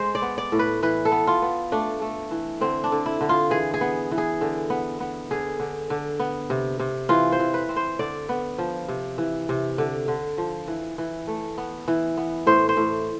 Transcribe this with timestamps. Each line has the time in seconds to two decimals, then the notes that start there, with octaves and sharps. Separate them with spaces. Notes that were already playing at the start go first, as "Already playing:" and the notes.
Already playing: G#3 C5
0.15 D5
0.22 B3
0.38 D5
0.52 A2
0.59 B4
0.83 E3 B4
1.05 A4
1.12 B3
1.27 F4
1.42 B3
1.72 A3 D4
2.02 A3
2.31 E3
2.61 D3 C4
2.84 D4
2.92 D3
3.06 E4
3.21 D3
3.29 F4
3.50 E3 G#4
3.74 G#4
3.81 B3
4.11 E3
4.18 G#4
4.41 D3
4.70 B3
5.00 B3
5.31 D3 G#4
5.59 D3
5.90 D3
6.19 B3
6.50 C3
6.79 C3
7.09 E3 F4
7.32 C5
7.40 E3
7.54 B4
7.69 C4
7.76 C5
7.99 D3 D5
8.29 B3
8.58 F3
8.88 C3
9.18 E3
9.49 C3
9.78 D3
10.08 D3
10.38 F3
10.68 E3
10.98 E3
11.27 A3
11.58 B3
11.88 E3
12.17 B3
12.46 A2 C5
12.69 C5
12.77 A2